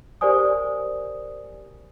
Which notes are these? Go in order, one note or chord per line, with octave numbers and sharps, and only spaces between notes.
G4 A#4 C5 D5 G#5 D#6